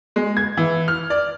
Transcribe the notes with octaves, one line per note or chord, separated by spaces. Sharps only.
G#3
G#6
E3
F6
D5